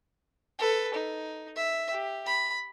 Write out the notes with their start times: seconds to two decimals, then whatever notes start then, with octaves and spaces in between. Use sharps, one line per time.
0.59 A4 B4
0.94 D#4
1.56 E5
1.91 G4
2.26 B5